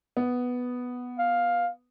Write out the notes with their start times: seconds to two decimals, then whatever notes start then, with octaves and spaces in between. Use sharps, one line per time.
0.17 B3
1.19 F5